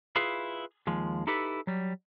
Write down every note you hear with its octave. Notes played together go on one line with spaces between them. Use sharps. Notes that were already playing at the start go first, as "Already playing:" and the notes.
E4 F4 G#4 B4 F5
D#2 F3 G#3
D#4 E4 G4 A4 B4
F#3 G3